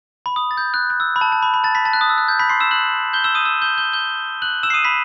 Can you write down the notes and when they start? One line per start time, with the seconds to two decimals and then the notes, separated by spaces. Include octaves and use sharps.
0.26 B5
0.36 D#6
0.51 A6
0.57 G6
0.74 F#6
0.90 F#6
1.00 E6
1.16 B5
1.21 A5
1.32 A5
1.43 B5
1.54 B5
1.64 A5 A6
1.75 B5 B6
1.85 A5 A6
1.93 F#6
2.01 D#6
2.09 E6
2.18 F#6
2.28 G6
2.40 B5 B6
2.49 C6 C7
2.60 E6 E7
2.71 F#6 F#7
3.13 G6 G7
3.24 E6 E7
3.35 D#6 D#7
3.45 E6 E7
3.62 G6 G7
3.78 G6 G7
3.93 G6 G7
4.42 F#6 F#7
4.63 E6 E7
4.70 C7
4.74 D#6 D#7
4.85 B5 B6